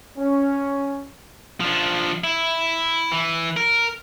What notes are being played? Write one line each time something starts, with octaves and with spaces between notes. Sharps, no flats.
C#4
F3 D4
E4
E3
A#4